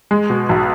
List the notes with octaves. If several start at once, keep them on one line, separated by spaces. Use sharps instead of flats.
G#3
B2
B1